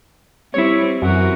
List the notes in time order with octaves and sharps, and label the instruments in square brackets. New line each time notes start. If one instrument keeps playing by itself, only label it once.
[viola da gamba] G3 C4 [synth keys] E4 C#5
[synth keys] F#2 [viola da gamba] E3 F#4 A#4